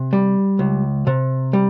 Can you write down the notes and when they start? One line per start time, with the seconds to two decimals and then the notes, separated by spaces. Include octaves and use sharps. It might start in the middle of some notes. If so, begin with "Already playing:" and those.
Already playing: C3
0.13 G3
0.59 C#2
1.07 C3
1.53 G3